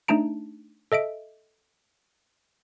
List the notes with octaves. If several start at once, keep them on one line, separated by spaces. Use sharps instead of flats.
A3 D4 D#4 A5 A#5 D7
A4 D#5 E5 D7